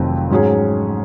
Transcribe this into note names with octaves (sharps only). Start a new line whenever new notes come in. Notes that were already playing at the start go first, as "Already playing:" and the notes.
Already playing: F1 F2 D#3 F#3 C4
G#2 F#3 C#4 G#4